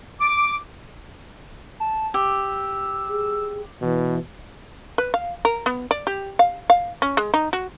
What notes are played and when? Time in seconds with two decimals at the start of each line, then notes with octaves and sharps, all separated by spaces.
0.20 D6
1.80 A5
2.14 G4 E6
3.09 G#4
3.81 B2 E3
4.98 B4
5.14 F5
5.45 A#4
5.66 B3
5.91 D5
6.07 G4
6.39 F5
6.70 F5
7.02 C#4
7.17 G#3
7.34 D#4
7.53 F#4